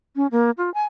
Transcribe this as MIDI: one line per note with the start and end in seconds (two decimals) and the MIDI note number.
0.16 0.27 61
0.31 0.51 58
0.58 0.72 65
0.74 0.83 80